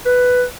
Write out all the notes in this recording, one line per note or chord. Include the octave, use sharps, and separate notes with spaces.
B4